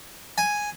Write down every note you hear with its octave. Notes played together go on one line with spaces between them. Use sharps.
G#5